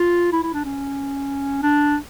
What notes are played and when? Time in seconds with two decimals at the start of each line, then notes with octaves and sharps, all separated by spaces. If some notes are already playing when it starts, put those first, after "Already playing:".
Already playing: F4
0.32 E4
0.43 E4
0.54 D4
0.65 C#4
1.63 D4